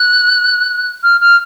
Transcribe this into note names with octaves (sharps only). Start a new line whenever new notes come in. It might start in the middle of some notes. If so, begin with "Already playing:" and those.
Already playing: F#6
F6
F6